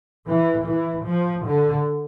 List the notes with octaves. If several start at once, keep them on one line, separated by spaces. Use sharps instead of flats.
E3
E3
F3
D3